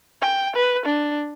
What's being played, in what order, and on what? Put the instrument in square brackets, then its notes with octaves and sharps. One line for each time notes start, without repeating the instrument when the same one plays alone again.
[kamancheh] G5
B4
D4